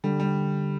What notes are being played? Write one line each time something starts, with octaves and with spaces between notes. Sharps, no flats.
D3 G3
G3